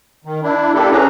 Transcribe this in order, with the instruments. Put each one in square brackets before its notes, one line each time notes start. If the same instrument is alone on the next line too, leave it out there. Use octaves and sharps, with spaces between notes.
[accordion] D#3
D4 E4
A#3 D4 E4 G4 A4
C#4 G#4 B4 A#5